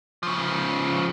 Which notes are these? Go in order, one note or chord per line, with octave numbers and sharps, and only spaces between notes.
C#3 F3